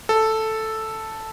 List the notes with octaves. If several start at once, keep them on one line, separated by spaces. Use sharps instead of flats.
A4